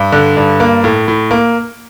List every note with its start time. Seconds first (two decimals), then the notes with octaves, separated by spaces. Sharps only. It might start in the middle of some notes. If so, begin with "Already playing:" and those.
Already playing: G2
0.12 D3
0.37 G2
0.60 A#3
0.84 A2
1.08 A2
1.31 A#3